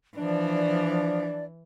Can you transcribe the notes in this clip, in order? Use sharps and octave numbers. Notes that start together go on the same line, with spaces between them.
E3 F3 D4 D5